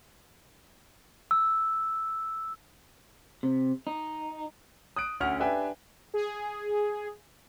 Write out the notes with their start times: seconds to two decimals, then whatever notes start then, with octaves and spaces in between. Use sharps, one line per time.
1.31 E6
3.43 C3
3.87 D#4
4.96 D#6 F#6 D7
5.20 D2 C#4 F#5 F6
5.40 D4 G4 B4 E5 G5 G#5
6.14 G#4